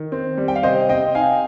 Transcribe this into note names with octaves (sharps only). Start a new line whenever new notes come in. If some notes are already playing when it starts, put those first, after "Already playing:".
Already playing: D#3
C4
G3
G5
F5
C3 C5 D#5
C3 D#5 G5
D#4 F5 G#5